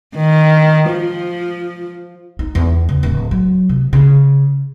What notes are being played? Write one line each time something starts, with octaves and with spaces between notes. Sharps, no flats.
D#3
F3
D#4
E2
C#3
D1
F#3
C3
C#3